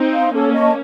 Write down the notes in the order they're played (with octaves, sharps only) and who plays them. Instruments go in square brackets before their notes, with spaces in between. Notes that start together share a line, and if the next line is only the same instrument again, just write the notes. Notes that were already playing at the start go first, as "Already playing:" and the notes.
Already playing: [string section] C4 D#4
[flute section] F5 C6
[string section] A#3 C#4 [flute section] A4
[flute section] D#5 A5 C#6